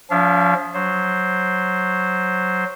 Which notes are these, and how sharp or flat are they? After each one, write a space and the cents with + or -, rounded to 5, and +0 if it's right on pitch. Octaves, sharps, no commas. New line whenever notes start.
F3 +25 D4 -45 F5 -40
F#3 +0 C5 +0